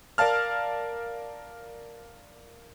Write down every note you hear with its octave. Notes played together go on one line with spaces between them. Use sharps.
A#4 D5 F5 A5 F6